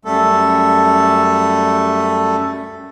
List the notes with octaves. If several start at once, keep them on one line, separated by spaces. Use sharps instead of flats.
F#2 G3 A3 A4